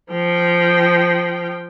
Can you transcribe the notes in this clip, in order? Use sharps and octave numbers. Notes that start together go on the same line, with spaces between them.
F3 G5